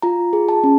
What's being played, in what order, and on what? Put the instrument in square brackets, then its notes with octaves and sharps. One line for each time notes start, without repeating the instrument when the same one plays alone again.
[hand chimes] F4 A#5
G#4
A5
C#4